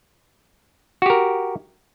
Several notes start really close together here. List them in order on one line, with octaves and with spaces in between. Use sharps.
F#4 G4 A#4